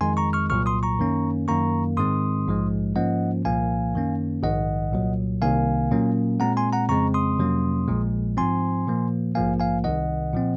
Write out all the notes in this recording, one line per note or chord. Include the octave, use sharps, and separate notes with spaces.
F2 D#3 G#3 G#5 C6
A#5 C#6
C#6 F6
C2 A#2 F#3 C#6 F6
C6 D#6
A#5 C#6
F#2 D#3 A#3 C#4
F#2 D#3 A#3 A#5 C#6
G#2 D#3 G#3 C4 C6 D#6
A#1 G#2 F3 G#3
G#2 F3 A#3 C#4 D#5 F#5
C2 A#2 F3 A#3 F5 G#5
F#2 D#3 A#3 C#4
A#1 G#2 D#3 D#5 F#5
C2 A#2 F#3
C2 C3 D#3 A#3 F5 G#5
A#2 F#3 A#3 C#4
A#2 G#3 C4 F#5 A#5
G#5 C6
F#5 A#5
F2 C#3 G#3 C4 A#5 C#6
C6 D#6
F2 C3 F#3 A#3 C#4
A#1 A#2 F3 G#3
G#2 F3 C4 G#5 C6
A#2 F3 A#3
A#1 G#2 F3 A#3 F5 G#5
F5 G#5
C2 C3 D#3 D#5 F#5
A#2 F3 C4